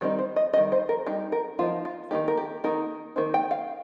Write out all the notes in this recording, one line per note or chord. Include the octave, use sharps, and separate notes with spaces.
D#3 G3 C4 D#4 A#4
C5
D#5
D#3 G3 D#4 D#5
C5
A#4
G3 D#4 G4
A#4
F3 A#3 D#4 F4
F4
D#3 A#3 D#4 G4
A#4
G4
D#3 A#3 D#4 A#4
D#3 A#3 D#4 C5
G5
F5